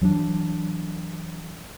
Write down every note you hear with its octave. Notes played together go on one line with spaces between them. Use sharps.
E3 F#3 G#3 D4